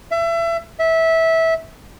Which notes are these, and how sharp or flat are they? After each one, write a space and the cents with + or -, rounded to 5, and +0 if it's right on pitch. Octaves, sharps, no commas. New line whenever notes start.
E5 +30
E5 -15